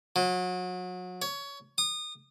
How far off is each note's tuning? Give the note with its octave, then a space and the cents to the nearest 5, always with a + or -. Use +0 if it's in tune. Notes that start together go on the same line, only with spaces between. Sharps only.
F#3 -30
C#5 +20
D#6 -30